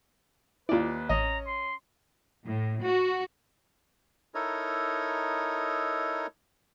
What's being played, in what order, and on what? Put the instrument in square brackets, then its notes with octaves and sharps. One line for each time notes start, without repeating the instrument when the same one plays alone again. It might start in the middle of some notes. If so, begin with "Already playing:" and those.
[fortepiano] D#2 D5 [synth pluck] E4 F4 [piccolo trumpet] B4
[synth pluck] A1 [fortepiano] C#4 D#5 [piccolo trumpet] A#5
[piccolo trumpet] C6
[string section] A2
F#4
[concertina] D#4 E4 A4 A#4 C#5 D#5